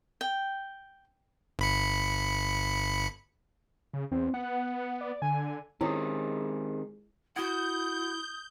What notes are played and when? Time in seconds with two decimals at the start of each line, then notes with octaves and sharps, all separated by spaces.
0.21 G5
1.59 G1 B5 C#7
3.94 C#3
4.12 E2 C4
4.34 B3 F#5
5.01 D5
5.22 D3 G#5
5.81 D#3 G#3 C4 C#4 E4 G4 G#4
7.36 E4 F#4 F#5 D#6 G6